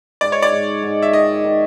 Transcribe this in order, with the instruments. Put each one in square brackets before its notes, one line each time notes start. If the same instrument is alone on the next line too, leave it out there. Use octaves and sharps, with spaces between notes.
[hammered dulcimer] G#2 [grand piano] D5
[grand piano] C#5
D5
[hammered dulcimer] G#2
G#2
[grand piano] E5
[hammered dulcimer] D#3 [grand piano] D#5
[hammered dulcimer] D#3